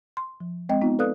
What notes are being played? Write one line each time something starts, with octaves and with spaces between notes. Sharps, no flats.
C6
F3
G#3 C4 D#5 G5
B3 D#4 F4
A4 B4 D5 F5 D#6 F#6